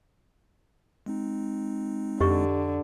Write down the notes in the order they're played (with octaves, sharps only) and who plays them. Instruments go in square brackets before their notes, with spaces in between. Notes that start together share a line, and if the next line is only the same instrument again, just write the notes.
[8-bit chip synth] G#3 C4 D#4
[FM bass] F2 [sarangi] D3 [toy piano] G4 D#5 C#6